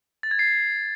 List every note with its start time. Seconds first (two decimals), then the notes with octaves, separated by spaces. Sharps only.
0.23 A6
0.31 G#6
0.39 C7